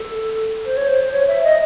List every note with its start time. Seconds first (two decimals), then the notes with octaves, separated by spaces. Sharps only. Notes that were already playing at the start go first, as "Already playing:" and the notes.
Already playing: A4
0.65 C5
0.77 C#5
0.88 C5
1.12 C#5
1.28 E5
1.44 D#5